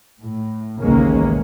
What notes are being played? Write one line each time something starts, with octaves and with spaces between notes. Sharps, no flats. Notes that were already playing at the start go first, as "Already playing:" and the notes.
A2
A1 D#2 C#3 G#3 A#3 C#4